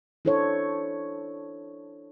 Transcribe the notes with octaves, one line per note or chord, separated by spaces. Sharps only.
D4 E4 A4 C5 C#5